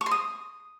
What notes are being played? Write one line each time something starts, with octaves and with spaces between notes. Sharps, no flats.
C#6
C6
D#6